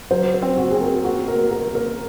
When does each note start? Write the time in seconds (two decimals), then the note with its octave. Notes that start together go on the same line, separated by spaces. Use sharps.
0.11 F#3 C5
0.34 C5
0.42 C4
0.58 F#4
0.71 C4 G#4
0.81 A#4
1.04 A#3 F#4
1.28 A#4
1.35 A#3
1.51 A#4
1.67 A#3
1.75 A#4